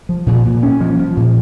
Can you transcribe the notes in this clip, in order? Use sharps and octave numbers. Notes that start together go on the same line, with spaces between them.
F3
A#2
A#2
C#4
F3
F3
A#2